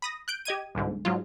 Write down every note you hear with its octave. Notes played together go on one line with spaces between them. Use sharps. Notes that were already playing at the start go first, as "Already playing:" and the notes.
B5 D#6 A#6
F#6 G6 D7
G4 D#5 G#6 D#7
G1 C2 G#2 D3
G#2 F#3 F4